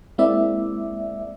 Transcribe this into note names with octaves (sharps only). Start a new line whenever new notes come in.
G#3 A#3 C4 E4 D5 E5